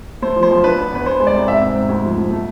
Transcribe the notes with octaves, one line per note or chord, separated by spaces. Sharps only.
A3 C5
F3
C5
B1
D4 B4
B3
E2 B4
B3 C5
G#3
D5
C2
G#2 E5
C4
G#2
D2
F3
D2
A3